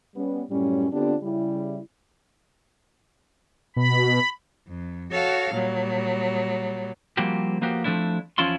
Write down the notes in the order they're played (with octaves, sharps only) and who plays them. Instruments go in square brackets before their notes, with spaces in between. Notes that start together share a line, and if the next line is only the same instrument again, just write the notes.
[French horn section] G3 B3 C#4
F#2 A2 G3 C#4
D3 B3 C4 D4 F4 G4
C#3 G3 E4
[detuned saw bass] B2 [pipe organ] B5
[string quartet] F2
F#4 A4 C#5 F5
A#2 F#3 G3
[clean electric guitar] F3 G3 A#3 C4 F#4 G4
F3 A#3 B3 F#4 G4
F3 A3 C4 D4 E4
E2 F3 C#4 E4 F4 C6